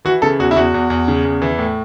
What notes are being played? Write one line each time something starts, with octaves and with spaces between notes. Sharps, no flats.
E3 F#4
C#3 A4
E2 F#4
E4
E2 F#4
E2
E2
C#3
E2
E3
A2